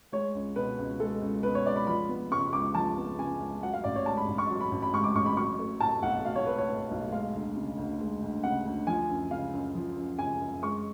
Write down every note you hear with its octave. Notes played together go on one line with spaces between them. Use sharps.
G#3 C#5
C#2
B2 B4
C#2
G#3 A4
C#2
B2 B4
C#5
C#2 D5
B5
F3 B5
B3
C#3 C#6
C#2 D6
F3 A5
B3
C#3 G#5
C#2
F#3 F#5
F5
A1 D5
C#5
G#2 A5
B5
A1
C#6
F#3
B5
A1
B5
G#2 C#6
D6
A1 C#6
B5
F#3 C#6
A3
A2 A5
B1 F#5
F#3 F5
C#5
A3 B4
C#5
A2
B1
G#3 F5
D2
C#3
D2
G#3
D2
C#3 F#5
D2
F3 G#5
F#2
C#3 F5
F#2
F3
F#2
C#3 G#5
F#2
G#3 C#6